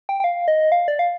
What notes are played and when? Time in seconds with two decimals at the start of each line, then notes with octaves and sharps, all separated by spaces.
0.09 G5
0.20 G5
0.24 F5
0.48 D#5
0.72 F5
0.88 D5
0.99 F5